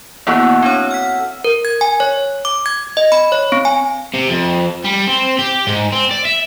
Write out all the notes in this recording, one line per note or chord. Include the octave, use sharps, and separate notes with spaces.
A#3 B3 E4 F#4 A4 E5
C4 D4 C#5
F6 B6
A#4
G#6
G#5
C#5
D6
G#6
D#5
B5
C#5
C4
G#5
C3
F2
G3
C4
G4
G#2
C4
D5
E5